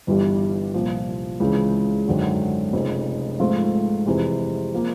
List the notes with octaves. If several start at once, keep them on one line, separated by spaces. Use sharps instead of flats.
G1 G2 E3 G3
C2 A#2 F3
C#2 C#3 E3 G#3 C4
G#1 F#2 D3 F#3
F1 F2 C#3
G#2 F3 A3 C4 F4
F2 C3 E3 G#3
F3 A#3